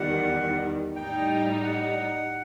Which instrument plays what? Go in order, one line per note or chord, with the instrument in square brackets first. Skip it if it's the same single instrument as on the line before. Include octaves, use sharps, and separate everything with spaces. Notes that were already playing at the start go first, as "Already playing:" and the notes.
Already playing: [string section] E2 D#3 G3 [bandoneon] F#5
[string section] A2 G3 D#4 [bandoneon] G5
[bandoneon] F#5